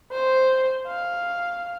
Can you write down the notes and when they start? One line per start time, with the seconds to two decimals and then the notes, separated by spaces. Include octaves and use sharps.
0.12 C5
0.87 F5